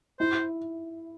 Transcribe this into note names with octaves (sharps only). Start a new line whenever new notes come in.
E4 C5